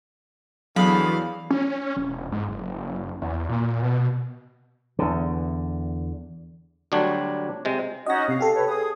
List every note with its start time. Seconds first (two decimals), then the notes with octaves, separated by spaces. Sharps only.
0.76 E2 D3 F#3 G#4 F5 B5
1.51 C#4
1.97 E1
2.32 G#2
2.48 F#1
3.22 E2
3.49 A#2
3.82 B2
4.99 E2 D3
6.92 D2 F#3 G3 D4 C#5
7.65 C3 G#3
8.06 C#4 D#4 F#4 D#5 A#6
8.28 C3 F5
8.41 G4 A4
8.53 B4 C#5
8.67 G#4 D#6